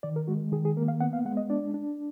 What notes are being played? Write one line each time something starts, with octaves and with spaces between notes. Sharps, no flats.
D#3 D5
A#4
G#3 F#4
D#3 G#4
G#4
A#3 A#4
F5
B3 F#5
F5
G#3 F#5
D#5
D4 D5
D4